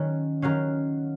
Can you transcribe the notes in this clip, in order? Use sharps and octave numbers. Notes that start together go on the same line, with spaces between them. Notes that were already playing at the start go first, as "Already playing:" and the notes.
Already playing: D#3 F#3 C#4
D#3 F#3 C#4 F5